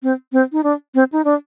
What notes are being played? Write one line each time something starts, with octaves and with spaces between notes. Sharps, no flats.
C4
C4
D#4
D4
C4
D#4
D4